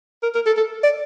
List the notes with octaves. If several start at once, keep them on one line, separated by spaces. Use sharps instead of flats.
A#4
A#4
A4
A4
D5